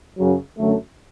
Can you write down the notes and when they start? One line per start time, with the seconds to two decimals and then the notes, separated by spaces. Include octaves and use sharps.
0.18 F#2 C#3 F#3
0.58 F#2 D3 F#3 A3